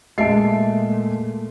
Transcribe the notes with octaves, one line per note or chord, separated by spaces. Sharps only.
A#2 G#3 A3 D#5 E5 A5 C7